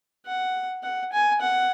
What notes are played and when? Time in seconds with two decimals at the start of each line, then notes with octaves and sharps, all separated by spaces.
0.27 F#5
0.83 F#5
1.12 G#5
1.41 F#5